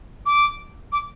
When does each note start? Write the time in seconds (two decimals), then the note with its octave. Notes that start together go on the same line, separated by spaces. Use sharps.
0.26 D6
0.92 D6